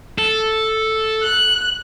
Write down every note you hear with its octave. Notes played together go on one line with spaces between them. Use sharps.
A4
F#6